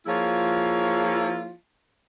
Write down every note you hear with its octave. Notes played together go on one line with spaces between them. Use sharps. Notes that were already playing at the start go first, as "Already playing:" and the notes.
F3 A#3 E4 F4 G#4 C#5